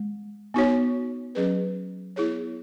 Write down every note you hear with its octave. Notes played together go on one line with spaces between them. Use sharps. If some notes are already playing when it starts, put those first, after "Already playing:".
Already playing: G#3
B3 D#4 F#4 C#5
F#3 C#4 G#4 B4
B3 E4 G#4 C#5